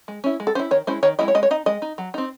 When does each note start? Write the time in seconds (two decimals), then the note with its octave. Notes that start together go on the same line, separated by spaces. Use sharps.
0.08 G#3
0.24 C#4 E4
0.40 G#3
0.47 A4
0.55 C#4 E4 C5
0.71 D#3 C#5
0.87 G#3 C#4 E4 C5
1.03 D#3 C#5
1.19 G#3 C#4 E4 D#5
1.28 C#5
1.35 G#3 D#5
1.43 C#5
1.51 D#4 D#5
1.66 G#3 D#5
1.82 D#4
1.98 F#3
2.14 C4 D#4